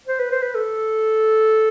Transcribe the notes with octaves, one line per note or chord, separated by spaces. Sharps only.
C5
B4
C5
B4
A4